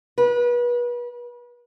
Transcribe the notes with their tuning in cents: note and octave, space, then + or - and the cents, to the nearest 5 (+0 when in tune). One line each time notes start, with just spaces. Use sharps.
B4 -35